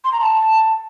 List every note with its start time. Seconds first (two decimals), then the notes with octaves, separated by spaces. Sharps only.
0.04 C6
0.12 A#5
0.20 A5